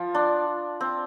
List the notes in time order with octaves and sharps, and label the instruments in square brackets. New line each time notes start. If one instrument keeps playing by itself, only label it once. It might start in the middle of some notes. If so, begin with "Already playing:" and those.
Already playing: [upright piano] F3 [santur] F4
[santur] D4
C4